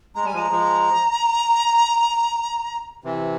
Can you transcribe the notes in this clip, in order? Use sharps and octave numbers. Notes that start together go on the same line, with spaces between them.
G#3 A#5
G3 G#5
F3 G#3
A#5
F3 G#3
C3 E3